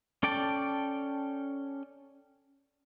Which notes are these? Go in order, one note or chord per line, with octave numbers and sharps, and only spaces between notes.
C#4 A4 D5 G5 A5